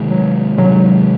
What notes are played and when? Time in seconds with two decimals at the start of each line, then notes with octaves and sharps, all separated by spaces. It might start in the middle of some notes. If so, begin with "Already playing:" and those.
Already playing: C3 D#3 G#3
0.11 F#3
0.58 C3 D#3 F#3 G#3